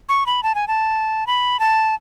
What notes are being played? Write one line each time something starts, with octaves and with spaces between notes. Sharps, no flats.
C#6
B5
A5
G#5
A5
B5
A5